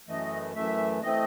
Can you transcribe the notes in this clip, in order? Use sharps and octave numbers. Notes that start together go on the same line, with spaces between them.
F#2 E3 A3 D#5
F#2 E3 A3 E5
E3 A3 C4 D#5